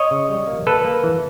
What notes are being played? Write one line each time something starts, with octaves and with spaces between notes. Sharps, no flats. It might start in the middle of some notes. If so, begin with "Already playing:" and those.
Already playing: C#5 D#5
C#3
G3
A#3
A#3 A4 B4
A#3
E3